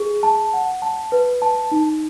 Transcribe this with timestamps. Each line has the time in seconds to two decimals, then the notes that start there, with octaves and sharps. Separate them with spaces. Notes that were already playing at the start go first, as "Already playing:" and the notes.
Already playing: G#4
0.23 A5
0.53 F#5
0.82 A5
1.12 B4
1.42 A5
1.72 D#4